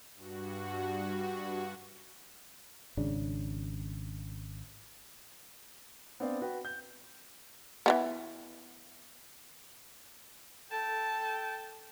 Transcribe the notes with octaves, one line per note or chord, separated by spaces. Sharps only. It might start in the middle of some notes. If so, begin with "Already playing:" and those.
G2 F#4
G#1 C#3 D4
B3 C4 D4 D5 F5 G5
F#4 B4 G5
G6
E3 G3 B3
A4 G5 A5